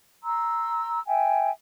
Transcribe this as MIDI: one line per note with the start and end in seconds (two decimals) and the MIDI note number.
0.22 0.99 82
0.22 0.99 84
0.22 0.99 88
1.06 1.48 76
1.06 1.48 79
1.06 1.48 80